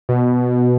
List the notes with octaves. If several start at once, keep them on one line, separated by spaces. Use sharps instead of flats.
B2